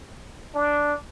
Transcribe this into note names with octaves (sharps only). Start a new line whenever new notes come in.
D4